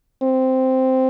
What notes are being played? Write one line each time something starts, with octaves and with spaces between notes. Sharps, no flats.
C4